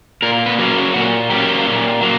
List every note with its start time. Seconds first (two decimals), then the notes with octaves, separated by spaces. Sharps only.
0.22 A#2 A#4
0.46 B4
0.58 F#3 A#3 C#4
0.71 A#4
0.94 A#2 F#4
1.30 F#3 A#3 C#4 G4
1.66 A#2
2.01 F#3 A#3